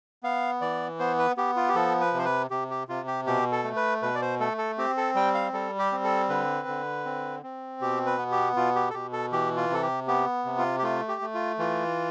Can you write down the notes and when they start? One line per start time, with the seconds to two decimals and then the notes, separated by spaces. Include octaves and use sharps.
0.23 B3 F5
0.61 E3 D5
0.99 B3 C5
1.19 B4
1.37 B3 G4
1.56 F4
1.68 G4
1.75 F3 A4
2.01 B4
2.13 C3
2.18 C5
2.25 B4
2.50 C3 G4
2.70 G4
2.88 C3 F4
3.08 G4
3.27 B2 G4
3.52 A4
3.64 A3
3.76 B4
4.02 B2 B4
4.15 D5
4.22 C5
4.40 A3 A4
4.58 A4
4.78 C4 G4
4.97 A4
5.15 G3 G5
5.34 F5
5.53 G3 A4
5.79 G4
5.92 C4
6.04 A4
6.29 D3 B4
6.68 D3
7.05 C4
7.43 C4
7.81 B2 G4
8.06 B4
8.18 B3
8.32 G4
8.56 B2 F4
8.76 G4
8.90 A4
8.94 B2 G4
9.13 A4
9.32 E3 G4
9.57 F4
9.70 C3 A4
9.82 G4
10.08 B3 G4
10.45 C3
10.58 F4
10.79 G4
10.83 A3 F4
11.08 G4
11.22 A3
11.34 F4
11.59 E3 F4